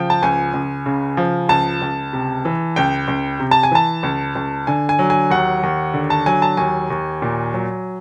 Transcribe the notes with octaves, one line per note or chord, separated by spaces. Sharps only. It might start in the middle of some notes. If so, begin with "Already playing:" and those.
Already playing: C#3 F3 G5
A5
C#2 G#5
C#2
C#3
F3
C#2 A5
C#2
C3
E3
C#2 G5
C#2
C3
A5
G#5
E3 A5
C#2
C#2
D3 G#5
G#5
F#3
G#5
D#2 F#5
D#2
D3
A5
F#3 G#5
A5
D#2 G#5
D#2
A#2
F#3